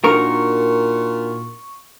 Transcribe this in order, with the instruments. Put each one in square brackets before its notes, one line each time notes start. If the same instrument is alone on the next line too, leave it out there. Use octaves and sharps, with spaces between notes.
[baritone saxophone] A#2 [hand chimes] D4 D#4 F#4 [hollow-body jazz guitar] A#4 [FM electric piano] C#6